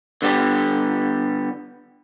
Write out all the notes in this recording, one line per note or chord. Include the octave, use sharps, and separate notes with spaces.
D3 G3 B3 G4